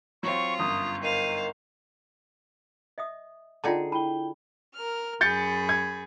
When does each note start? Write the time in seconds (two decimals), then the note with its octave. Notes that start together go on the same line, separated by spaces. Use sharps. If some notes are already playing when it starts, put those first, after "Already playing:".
0.23 F#3 C4 F4 C#6
0.59 G1 F#2 D#6
1.03 D#3 C5 F5 D#7
2.98 D#5 E5 D#6
3.64 D3 D#4 F4 G#4 G5 A5
3.92 E4 G5 A5 B5 G7
4.75 A#4 F6
5.21 F#2 G#4 B5 G6 A6 C#7
5.69 G#6